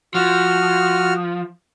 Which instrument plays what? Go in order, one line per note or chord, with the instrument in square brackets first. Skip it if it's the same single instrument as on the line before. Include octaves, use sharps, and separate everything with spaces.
[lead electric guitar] F3 [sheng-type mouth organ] F#4 F6